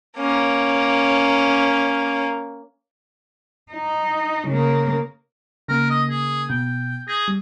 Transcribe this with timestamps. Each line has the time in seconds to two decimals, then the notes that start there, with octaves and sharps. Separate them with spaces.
0.18 A#3 C#4
3.72 D#4
4.47 C#3 A#3
5.68 C#3 A#3 A#4
5.90 D#5
6.10 G#4
6.50 B2 G5
7.08 G#4 G6 A#6
7.28 G3